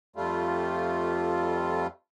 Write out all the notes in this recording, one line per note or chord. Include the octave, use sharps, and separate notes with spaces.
F2 G3 A3 F4